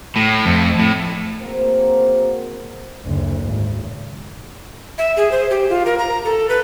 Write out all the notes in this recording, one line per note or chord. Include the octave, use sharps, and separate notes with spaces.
A2
F2
A2
A#3 C4 F#4 G#4 A#4 C5
F#1 D2
G#1
E5
G#4
C5
G4
F4
A#4
A#5
A4
B4